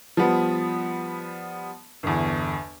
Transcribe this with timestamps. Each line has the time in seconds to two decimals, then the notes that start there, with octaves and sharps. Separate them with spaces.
0.17 F3 G3 B3
2.03 G1 E2